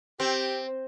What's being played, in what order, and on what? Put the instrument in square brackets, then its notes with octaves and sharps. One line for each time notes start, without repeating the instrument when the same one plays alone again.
[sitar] C4 [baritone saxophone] G4